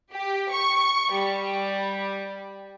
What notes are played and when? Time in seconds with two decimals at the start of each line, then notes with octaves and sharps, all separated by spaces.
0.13 G4
0.52 C#6
1.13 G3